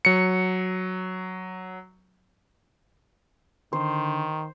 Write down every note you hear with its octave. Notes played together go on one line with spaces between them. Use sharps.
F#3 C#7
D3 D#3 C5